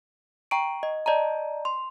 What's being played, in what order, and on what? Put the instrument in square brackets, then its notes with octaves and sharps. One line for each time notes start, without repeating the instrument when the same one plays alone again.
[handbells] G5 A#5 C#6 D7
D#5
D5 D#5 A5 A#5
C6